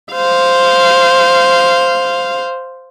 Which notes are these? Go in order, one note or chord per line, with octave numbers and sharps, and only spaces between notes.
C5 F5